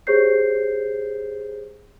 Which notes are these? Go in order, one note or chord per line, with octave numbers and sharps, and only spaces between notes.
G4 G#4 C5 C#5 G6 C7